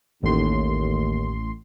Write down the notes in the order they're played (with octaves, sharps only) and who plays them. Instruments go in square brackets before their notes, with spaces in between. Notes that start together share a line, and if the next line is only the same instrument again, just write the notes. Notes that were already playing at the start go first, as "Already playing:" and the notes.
[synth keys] A1 A2 C6 [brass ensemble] D#2